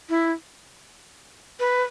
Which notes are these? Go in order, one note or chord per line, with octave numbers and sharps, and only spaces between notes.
E4
B4